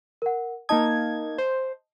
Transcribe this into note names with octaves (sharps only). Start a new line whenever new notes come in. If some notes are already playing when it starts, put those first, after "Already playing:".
A#4 F#5
A#3 D#4 D#5 A5 D#6 G#6
C5